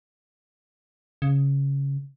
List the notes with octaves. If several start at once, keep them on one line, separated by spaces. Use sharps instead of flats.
C#3